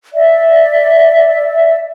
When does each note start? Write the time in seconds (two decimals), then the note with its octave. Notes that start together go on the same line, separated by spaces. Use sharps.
0.15 D5 E5